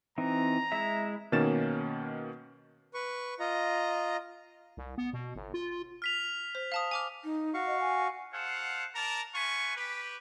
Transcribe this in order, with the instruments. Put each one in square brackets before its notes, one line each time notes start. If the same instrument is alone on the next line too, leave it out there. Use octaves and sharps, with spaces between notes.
[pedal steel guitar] E3 C4 D#4 [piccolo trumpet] A#5
[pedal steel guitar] G#3 E4 E5
[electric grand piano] B2 D#3 A#3 C#4 A6 E7
[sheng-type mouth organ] B4 C#6
F4 D#5 A#5
[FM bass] C2
B3
B2
G1
F4
[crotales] F6 B6 F7
[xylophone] C5
F5 A5 D#6
G#5 D6 F6
[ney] D#4
[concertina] F#4 F5 C#6
[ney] D#5
G#5
[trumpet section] A4 C5 F5 F#5
A#4 D5 A5 A#5
F4 B4 G#5 C#6
G4 B4